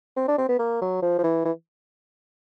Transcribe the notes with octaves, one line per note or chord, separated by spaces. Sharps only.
C4
D4
C4
B3
A#3
F#3
F3
F3
E3
E3